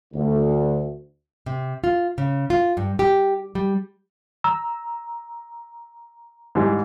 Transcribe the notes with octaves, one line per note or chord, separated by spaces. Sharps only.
D2
C3
F4
C#3
F4
G2
G4
G3
A#5 E6
G#2 E3 G3